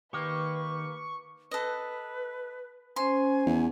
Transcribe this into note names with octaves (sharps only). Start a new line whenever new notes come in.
D#3 A#3 G4 B4 C#6
A4 B4 D#5
C#4 C5 G#5 C6
E2